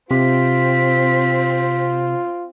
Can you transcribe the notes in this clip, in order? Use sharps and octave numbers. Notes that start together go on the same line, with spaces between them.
C3 C4 F4 B6